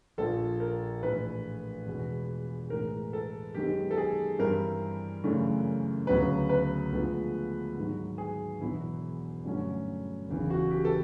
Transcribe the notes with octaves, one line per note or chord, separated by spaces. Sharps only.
A#1 A#2 F3 A4
A#4
A#1 A2 E3 A3 B4
E2 B2 G#3
A2 E3 G#3 A#4
A4
F#2 D#3 G#3 B3 D#4 G4
A4
G#4
G2 E3 G3 C4 E4 A#4
F#2 C#3 E3 A3 D4
D2 C#3 F#3 B3 B4
B4
D2 D3 F3 G#3 B3
G#2 D#3 F#3
G#4
E1 E2 B2 F#3 B3 E4
G2 D3 F#3 A3 C#4
F#1 E2 C#3 E3
F#4
G4
A4